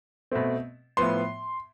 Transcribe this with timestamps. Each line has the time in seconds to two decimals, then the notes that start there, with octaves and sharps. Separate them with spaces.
0.31 B2 A3 C4
0.97 A2 F3 B3 C6